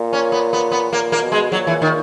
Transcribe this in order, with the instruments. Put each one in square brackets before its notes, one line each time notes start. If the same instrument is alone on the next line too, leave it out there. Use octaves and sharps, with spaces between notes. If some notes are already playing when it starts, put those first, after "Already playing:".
Already playing: [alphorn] A#2
[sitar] C#4
B3
B3
B3
[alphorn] A#2 [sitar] A#3
[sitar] A#3
[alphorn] B2
[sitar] G#3
[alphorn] A#2 [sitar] F#3
[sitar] E3
D#3